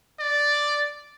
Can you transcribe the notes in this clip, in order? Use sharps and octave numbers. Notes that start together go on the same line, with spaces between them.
D5